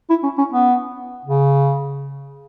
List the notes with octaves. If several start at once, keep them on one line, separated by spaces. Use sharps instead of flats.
E4
C#4
C#4
B3
C#3